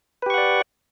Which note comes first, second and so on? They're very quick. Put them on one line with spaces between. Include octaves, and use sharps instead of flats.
B4 G4 C#6 F#5 D5